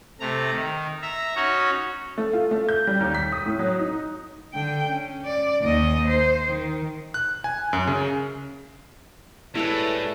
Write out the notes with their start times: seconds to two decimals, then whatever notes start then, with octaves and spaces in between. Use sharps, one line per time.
0.20 C3 A3 A#5
0.51 D#3
1.02 E5 A#5
1.35 C#4 D#4 F#4 C#5
2.18 A3
2.33 F4
2.51 A3
2.69 G6
2.87 G3
3.00 D#2
3.15 B6
3.32 D#6
3.46 A2
3.59 F#3
3.79 D#4
4.54 D3 G5
4.88 C#4
5.25 D5
5.62 D#2 D#5
6.07 C5
6.49 D#3
7.14 F#6
7.44 G#5
7.73 F#2
7.87 C#3
9.55 A2 G3 G#3 E4 A4 B4